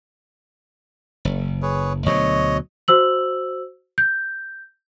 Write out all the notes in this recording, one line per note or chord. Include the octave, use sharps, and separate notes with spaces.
F#1
G#4 B4 C#5
D2 B2 F#3 C#5 D#5
F#4 C5 E6 F#7
G6